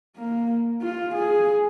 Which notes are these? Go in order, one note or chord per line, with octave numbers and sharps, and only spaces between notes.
A#3
F4
G#4